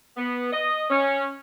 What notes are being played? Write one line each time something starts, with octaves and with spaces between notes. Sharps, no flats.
B3
D#5
C#4